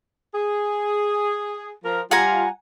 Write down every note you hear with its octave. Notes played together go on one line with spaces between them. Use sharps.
G#4
F3 A#4
G3 F4 F#5 G#5 A#5